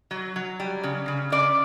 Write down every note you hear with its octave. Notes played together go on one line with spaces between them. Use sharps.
F#3
F#3
G3
C#3
C#3
C#3 D5